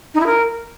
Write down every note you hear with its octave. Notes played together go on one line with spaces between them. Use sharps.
D#4
E4
A#4